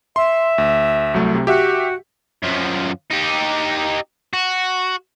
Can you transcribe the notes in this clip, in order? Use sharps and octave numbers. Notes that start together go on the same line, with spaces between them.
E5 C6
D2
C2 F#3 A3
C3
F#4 G4 E5
F#2 F3
D#4 G4
F#4